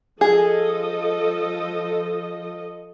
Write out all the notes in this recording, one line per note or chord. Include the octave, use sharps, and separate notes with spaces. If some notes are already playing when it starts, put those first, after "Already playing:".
F3 G#4 A4 D#5